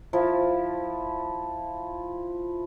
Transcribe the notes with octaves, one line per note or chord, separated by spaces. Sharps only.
F3 E4